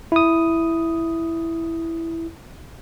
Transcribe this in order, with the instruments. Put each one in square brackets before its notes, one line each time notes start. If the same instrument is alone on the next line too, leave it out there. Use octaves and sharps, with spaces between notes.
[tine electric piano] E4 D#6